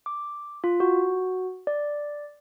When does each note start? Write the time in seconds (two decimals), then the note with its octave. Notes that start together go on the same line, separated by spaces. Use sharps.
0.06 D6
0.64 F4
0.80 F#4
1.67 D5